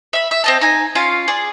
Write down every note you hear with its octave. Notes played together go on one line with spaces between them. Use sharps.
E5 B5
E5
C4 D#5 A5
D#4 G#5
C#4 F4 F5
G#4 D5